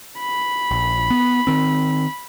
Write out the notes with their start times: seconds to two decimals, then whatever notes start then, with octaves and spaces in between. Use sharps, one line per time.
0.20 B5
0.71 A#1
1.10 B3
1.47 D#3 C4